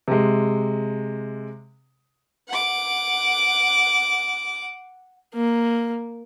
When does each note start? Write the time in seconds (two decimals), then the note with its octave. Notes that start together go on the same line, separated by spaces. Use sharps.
0.08 C3 G#3
2.48 F#5 D6
5.34 A#3